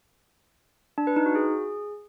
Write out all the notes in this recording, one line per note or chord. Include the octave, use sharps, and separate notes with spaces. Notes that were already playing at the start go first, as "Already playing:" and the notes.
D4
B4
D#4
F#4
G#4